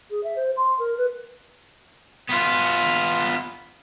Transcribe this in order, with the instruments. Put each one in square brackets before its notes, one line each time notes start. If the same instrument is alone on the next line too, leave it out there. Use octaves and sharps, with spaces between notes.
[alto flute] G#4
E5
C5
C6
A#4
B4
[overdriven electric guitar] B3 F4